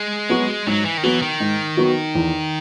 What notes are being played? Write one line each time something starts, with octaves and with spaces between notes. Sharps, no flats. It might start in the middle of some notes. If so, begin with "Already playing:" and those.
Already playing: G#3
F#3 B3 F#4
G#2 F#3
E3
D#3
E3 F#3 B3 F#4
D#3
G#2
F#3 B3 F#4
E2